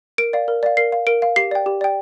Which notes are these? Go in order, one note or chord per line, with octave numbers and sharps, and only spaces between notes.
A#4 D7
D5 F5
A#4
D5 F5
A#4 C7
F5
A#4 D7
F5
G4 C7
D5 G5
G4
D5 G5